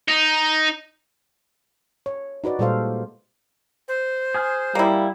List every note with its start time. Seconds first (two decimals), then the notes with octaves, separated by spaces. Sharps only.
0.08 D#4
2.06 C#5
2.44 D#4 F#4 B4 D5
2.59 A#2 G3 G#3 A4 C5 F5
3.88 C5
4.34 G#4 G#5 F6
4.75 G3 A#3 E4